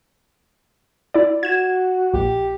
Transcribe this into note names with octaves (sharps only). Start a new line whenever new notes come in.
E4 D5
F#4 G#6 E7
A#1 G4